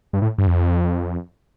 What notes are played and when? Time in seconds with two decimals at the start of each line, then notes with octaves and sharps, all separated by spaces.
0.13 G2
0.22 A2
0.38 G2
0.47 F2